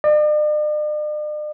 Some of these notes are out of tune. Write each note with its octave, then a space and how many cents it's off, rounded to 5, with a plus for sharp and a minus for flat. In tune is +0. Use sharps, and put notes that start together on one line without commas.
D5 +45